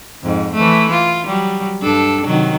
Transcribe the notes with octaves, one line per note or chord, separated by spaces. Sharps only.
F2 G#2
E3 A3
F4
F#3 G3
G2 D4 A4
C3 D#3 F#3